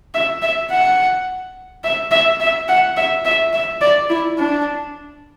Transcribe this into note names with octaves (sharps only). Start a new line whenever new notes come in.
E5
E5
F#5
E5
E5
E5
F#5
E5
E5
E5
D5
E4
D4